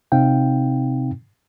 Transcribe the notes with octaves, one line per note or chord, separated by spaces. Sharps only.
C3 C4 D#4 F5 G5